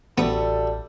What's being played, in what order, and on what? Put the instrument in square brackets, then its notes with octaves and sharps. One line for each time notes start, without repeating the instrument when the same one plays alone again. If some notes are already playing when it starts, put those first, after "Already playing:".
[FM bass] A1 [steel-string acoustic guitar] D2 G3 [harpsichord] B3 [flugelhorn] A4